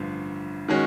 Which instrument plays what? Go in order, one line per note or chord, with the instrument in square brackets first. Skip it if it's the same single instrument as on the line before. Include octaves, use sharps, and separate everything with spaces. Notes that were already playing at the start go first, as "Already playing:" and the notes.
Already playing: [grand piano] A1 G2 D3 F3
D#3 G#3 C#4 F#4